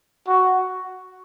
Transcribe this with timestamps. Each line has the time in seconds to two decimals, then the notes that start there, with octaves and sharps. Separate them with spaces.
0.27 F#4